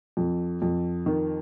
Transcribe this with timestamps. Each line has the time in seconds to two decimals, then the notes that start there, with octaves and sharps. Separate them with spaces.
0.17 F2
0.62 F2
1.06 D#3